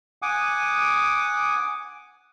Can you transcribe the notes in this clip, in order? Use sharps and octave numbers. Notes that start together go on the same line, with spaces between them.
F#5 G#5 D6 D#6